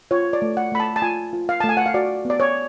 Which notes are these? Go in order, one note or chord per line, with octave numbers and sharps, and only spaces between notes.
F4 C#5
D5
A3
F#5
A3 B5
A5
A5
F4 G#5
F4
F5
A3 A5
G#5
F#5
F5
F#4 D5
B3
D5
C#5